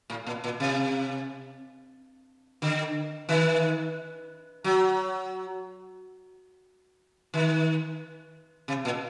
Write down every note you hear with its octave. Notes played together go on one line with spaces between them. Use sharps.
A2
A#2
A#2
C3
D3
D#3
F#3
D#3
C3
A#2